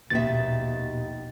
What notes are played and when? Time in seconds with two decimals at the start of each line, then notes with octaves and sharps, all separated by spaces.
0.10 A#1 D#2 B2 D#3 E5 A6